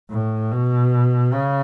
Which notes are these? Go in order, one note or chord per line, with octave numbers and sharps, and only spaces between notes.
A2
B2
C#3